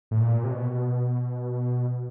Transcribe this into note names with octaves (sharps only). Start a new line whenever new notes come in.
A2
A#2
C3
B2